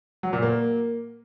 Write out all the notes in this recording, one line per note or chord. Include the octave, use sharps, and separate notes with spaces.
F#3
A#2
A#3